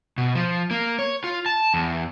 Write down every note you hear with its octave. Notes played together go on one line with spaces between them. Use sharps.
B2
F3
A#3
C#5
F4
A5
E2